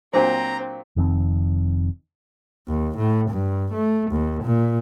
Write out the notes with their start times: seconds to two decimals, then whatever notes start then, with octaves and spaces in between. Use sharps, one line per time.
0.13 A#2 F#3 C4 D4 C5 A#5
0.96 F1 F2 D#3 C4
2.68 D#2
2.97 A2
3.30 G2
3.73 A3
4.11 D#2
4.43 A#2